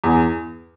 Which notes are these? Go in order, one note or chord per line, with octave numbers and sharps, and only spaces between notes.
E2